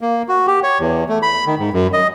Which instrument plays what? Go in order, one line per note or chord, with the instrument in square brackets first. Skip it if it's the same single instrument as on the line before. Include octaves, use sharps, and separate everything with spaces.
[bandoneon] A#3
F#4
G4
C#5
E2
A3
B5
D#3
G#2
F#2
D#5